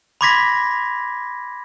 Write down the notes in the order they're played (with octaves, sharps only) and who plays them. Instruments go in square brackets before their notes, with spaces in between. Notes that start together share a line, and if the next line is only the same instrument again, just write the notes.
[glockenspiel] B5 C6 D6 G#6 A#6 B6